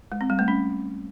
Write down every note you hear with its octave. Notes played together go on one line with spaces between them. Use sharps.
G#3
C4
G3
A3
C#4